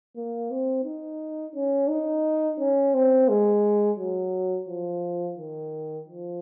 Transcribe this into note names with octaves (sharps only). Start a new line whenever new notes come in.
A#3
C4
D#4
C#4
D#4
C#4
C4
G#3
F#3
F3
D#3
F3